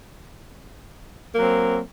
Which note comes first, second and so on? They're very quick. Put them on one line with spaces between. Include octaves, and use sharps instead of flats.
A#3 F#3 C4